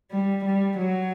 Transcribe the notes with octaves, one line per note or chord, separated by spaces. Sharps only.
G3
G3
F#3